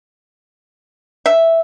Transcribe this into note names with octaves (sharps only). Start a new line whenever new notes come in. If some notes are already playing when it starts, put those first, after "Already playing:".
E5